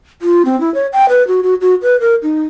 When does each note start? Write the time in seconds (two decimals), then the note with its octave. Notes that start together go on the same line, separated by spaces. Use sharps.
0.22 F4
0.45 C4
0.60 E4
0.74 C#5
0.93 G5
1.09 B4
1.27 F#4
1.43 F#4
1.61 F#4
1.82 B4
2.00 A#4
2.23 D#4